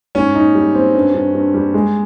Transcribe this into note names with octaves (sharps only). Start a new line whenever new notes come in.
G#2 C#4
D#4
G3
C4
G2
G2
G2
G3
G#3